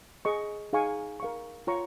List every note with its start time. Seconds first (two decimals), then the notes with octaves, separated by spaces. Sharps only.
0.25 G#4 D#5 C#6
0.73 D#4 G#4 F5 G#5 C#6
1.20 A#4 F5 C#6
1.67 F4 C#5 A#5 C#6